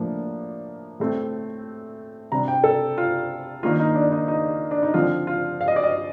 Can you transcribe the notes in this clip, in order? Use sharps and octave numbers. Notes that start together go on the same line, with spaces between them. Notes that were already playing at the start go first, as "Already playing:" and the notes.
Already playing: A2 F3 A#3 D4
A2 A3 C4
C3 G3 D4 A#5
G5
A4
F4
D#3 A#3 D4 F4
D#4
D4
D#4
D#4
D4
D#4
D3 F3 C4 F4
F4
F5
D#5
D5
D#5